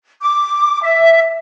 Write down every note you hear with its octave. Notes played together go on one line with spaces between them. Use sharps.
D6
E5